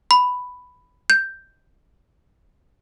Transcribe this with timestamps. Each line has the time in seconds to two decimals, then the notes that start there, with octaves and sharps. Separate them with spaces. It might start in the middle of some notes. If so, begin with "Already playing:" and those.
0.11 B5
1.10 G6